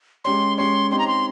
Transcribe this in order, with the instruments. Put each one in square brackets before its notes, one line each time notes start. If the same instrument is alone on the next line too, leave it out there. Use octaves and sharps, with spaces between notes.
[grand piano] G#3 C#4 G4 C#5 [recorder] C6
[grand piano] G#3 C#4 G4 C#5 [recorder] C6
[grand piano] C4 D#4 G4 C#5 [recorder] C6
[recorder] A#5
C6